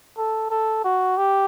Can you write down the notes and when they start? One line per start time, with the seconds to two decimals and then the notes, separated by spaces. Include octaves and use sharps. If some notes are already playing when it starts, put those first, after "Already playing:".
0.17 A4
0.50 A4
0.84 F#4
1.17 G4